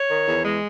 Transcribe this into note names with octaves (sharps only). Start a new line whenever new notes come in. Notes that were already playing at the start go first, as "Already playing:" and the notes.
Already playing: C#5
D#3
E2
G#3